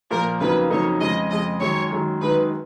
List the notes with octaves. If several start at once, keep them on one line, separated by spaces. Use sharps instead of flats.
A#2 F3 A#3 A#4
F2 C#3 F#3 A#3 D#4 B4
F2 C#3 F#3 A#3 D#4 C#5
F2 C#3 G#3 D#5
F2 C#3 G#3 D#5
F#2 D#3 G#3 C#5
F#2 D#3 G#3
F#2 D#3 G#3 D#4 B4